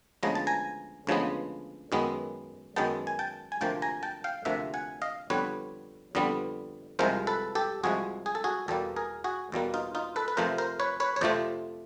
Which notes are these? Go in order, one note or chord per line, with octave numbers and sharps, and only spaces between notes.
D2 C#3 F3 G#3 B3 A#5
A5
G#5 A#5
D2 C#3 F3 G#3 B3
F#2 D#3 G#3 B3
F#2 D#3 G#3 B3 G5 A5
G#5
G5 A5
G#5
D2 C3 F3 A#3 G5 A5
G#5 A#5
G5 A5
F5 G5
D2 C3 F3 A#3 E5 F#5
F#5 G#5
D#5 F5
F2 D3 G3 B3 B4 C#5
F2 D3 G3 B3
C2 C3 F3 G#3 A#4 C5
A4 B4
G4 A4
C2 C3 F3 G#3 F#4 G#4
G#4
A4
F#4 G#4
E2 B2 G3 A#3 G4 A4
G#4 A#4
F#4 G#4
E2 B2 G3 A#3
D#4 F4
D#4 F4
A4 B4
B4
F2 C3 F3 A3 A#4 C5
A#4 C5
B4 C#5
B4 C#5
C#5
F2 C3 F3 A3 C5 D5